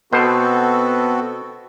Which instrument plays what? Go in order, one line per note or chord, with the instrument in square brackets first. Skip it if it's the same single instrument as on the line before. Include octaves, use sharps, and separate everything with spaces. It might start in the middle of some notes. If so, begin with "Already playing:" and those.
[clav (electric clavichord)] B2 C5 [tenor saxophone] B3 [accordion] C4 F#4 A4